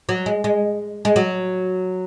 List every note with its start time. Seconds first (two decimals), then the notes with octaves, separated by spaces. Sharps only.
0.09 F#3
0.26 G#3
0.44 G#3
1.05 G#3
1.16 F#3